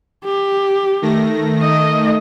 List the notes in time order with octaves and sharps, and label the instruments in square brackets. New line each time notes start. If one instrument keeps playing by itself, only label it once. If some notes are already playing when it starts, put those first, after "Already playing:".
[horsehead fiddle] G4
[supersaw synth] D#3 A3 A#6
[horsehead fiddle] D#5